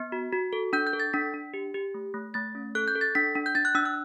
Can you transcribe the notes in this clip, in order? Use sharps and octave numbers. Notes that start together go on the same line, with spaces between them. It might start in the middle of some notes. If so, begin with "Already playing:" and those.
Already playing: B3
F#4
F#4
A4
D4 G6
G6
A4
A6
D4 B6
D4
G4
G4
A3
A3
A3 A6
C#4
A4 F#6
G6
A4
A6
D4 B6
D4
G6
D4 A6
F#6
D4 E6
F#6